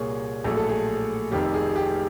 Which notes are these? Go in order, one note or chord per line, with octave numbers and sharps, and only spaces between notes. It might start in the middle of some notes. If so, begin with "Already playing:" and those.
Already playing: C2 A#2 G3 A#3 G#4 C#5
A#1 A2 F#3 A3 G#4
A4
G#4
F1 F2 C3 D#3 G4
G#4
G4